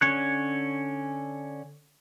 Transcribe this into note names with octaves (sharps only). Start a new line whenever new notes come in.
D3 C#4 C#5 F#6